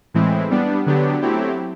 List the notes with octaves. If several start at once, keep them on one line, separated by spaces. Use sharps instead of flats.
A2 E3 G#3 C4 E4
G3 B3 D4
D3 F#3 B3 D4 G4
F#3 A3 C4 E4 G4